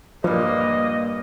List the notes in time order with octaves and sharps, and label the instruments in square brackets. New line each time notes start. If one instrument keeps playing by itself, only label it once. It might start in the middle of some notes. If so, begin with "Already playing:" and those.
[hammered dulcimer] G2 A#2 [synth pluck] F3 [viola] A#3 [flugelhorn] D#5